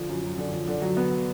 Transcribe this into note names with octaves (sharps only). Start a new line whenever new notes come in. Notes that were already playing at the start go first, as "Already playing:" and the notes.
Already playing: D3 F3
F#2
F#2
D3
F3
D3
F#3
B3